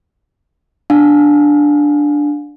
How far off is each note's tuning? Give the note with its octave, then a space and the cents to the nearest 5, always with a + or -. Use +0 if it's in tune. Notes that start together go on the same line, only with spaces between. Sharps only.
D4 +0 F5 +35